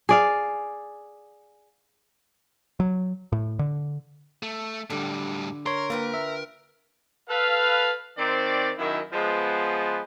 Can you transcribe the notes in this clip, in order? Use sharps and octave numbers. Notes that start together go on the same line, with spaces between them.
G#4 D5 F5
F#3
A2
D3
A3
A2 D3 G3
A#4 C#5 C6
A#3 F4 B4 G5
E5
A4 B4 F5
D#3 C4 D5
F#2 D#3 E4
F3 G#3 B3